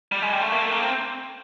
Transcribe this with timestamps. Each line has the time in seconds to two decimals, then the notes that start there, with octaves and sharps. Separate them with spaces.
0.12 G3
0.22 G#3
0.33 G3
0.41 A3
0.52 A#3
0.62 A3
0.72 A#3
0.82 C4